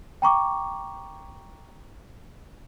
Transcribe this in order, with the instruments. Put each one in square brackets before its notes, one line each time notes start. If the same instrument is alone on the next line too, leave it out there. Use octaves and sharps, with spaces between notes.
[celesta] G5 A#5 C#6 D6